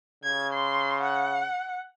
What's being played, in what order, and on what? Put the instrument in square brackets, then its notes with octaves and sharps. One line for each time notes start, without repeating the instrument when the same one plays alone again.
[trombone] C#3 [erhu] G#6
[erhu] C6
F#5